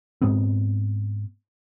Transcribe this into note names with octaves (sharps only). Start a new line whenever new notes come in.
G#2 G#3 B3 C4